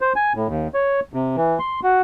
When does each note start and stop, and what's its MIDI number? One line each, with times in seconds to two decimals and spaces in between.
0.01 0.13 72
0.16 0.33 80
0.35 0.47 45
0.48 0.68 39
0.74 1.00 73
1.14 1.36 48
1.36 1.59 52
1.59 1.80 84
1.83 2.02 66